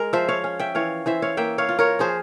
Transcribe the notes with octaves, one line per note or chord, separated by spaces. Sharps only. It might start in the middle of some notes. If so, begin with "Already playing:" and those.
Already playing: G#3 A#4
F3 C5 E5
C#5 F5
C#4
E5 G5
E3 C#5 F5
E3 C5 E5
C#5 F5
A#3 E5 G5
C#5 F5
F4
A#4 C#5
F3 G#4 C5